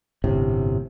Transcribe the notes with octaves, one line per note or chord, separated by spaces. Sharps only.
G1 A2 C3